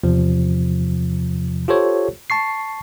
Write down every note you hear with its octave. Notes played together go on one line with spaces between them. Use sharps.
E2 C3 F3
F4 G4 A4 C5 C#5
A5 C#6 C7